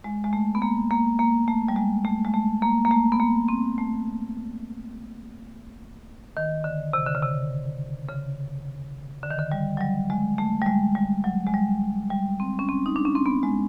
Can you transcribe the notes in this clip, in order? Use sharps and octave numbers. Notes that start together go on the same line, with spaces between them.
G#3
G#3
A3
B3
A#3
A#3
A#3
A3
G3
G#3
A3
G#3
A3
A#3
A#3
A3
B3
A#3
C4
A3
D#3
D3
C3
D3
C#3
C3
C#3
D3
D#3
D3
G3
F#3
G3
G#3
A3
G3
G#3
G3
F#3
G#3
G3
G3
C4
C#4
C4
D#4
D4
C#4
C4
B3
G#3